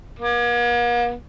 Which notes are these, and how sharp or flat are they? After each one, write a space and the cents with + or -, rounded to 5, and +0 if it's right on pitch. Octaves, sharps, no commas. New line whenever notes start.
A#3 +45